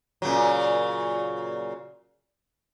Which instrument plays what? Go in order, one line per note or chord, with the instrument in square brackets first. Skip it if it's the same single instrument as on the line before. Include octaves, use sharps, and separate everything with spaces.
[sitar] A#2 C#3 F#3